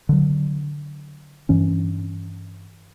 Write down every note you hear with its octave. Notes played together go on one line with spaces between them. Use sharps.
D3 F#3
G2 E3 C#4